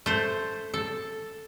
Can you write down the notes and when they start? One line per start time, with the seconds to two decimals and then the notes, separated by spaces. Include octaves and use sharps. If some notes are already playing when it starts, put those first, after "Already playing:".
0.06 A3 C5
0.74 A4